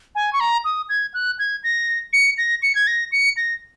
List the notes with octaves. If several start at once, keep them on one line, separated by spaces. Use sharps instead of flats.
G#5
C#6
A#5
D#6
G#6
F#6
G#6
A#6
C#7
A#6
C#7
G#6
A#6
C#7
A#6